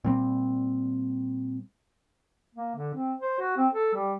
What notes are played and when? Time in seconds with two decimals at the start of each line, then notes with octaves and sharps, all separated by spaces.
0.04 A#2 G3 C4
2.55 A#3
2.76 D3
2.94 C4
3.20 C5
3.39 F#4
3.57 C4
3.73 A4
3.94 G3